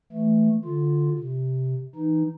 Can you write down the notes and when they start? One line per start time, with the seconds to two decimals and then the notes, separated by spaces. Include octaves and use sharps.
0.12 E3 A3
0.65 D3 F4
1.18 C3
1.95 E3 D#4